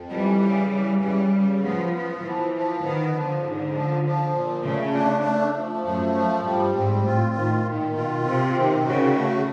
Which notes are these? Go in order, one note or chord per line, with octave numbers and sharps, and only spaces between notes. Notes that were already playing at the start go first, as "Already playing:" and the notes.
Already playing: F2
E3 G3
C#3
E3
C#3 G3
C#3
F3 B3
B3
E3 F3
F3
D#3 B3
D3 F3
G#2
F3
F3
A#2
C#3 A3
D4
A3
F3
F#2 A3
F3
G2 G3
G#2 C4
A2 F4
A2 D#3
A#2 D#3
B2 F4
C3 C4
D#3
C#3 F#4
A3